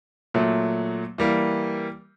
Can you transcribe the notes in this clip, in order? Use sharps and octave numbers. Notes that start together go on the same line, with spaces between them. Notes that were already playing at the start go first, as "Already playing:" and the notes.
A#2 F#3 A3
E3 G3 A#3